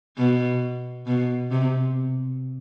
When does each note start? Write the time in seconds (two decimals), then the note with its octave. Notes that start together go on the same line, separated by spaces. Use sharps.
0.17 B2
1.07 B2
1.51 C3